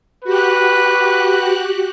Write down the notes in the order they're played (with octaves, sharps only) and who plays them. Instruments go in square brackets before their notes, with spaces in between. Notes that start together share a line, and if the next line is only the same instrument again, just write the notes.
[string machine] F#4 G4 F#6 [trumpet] B4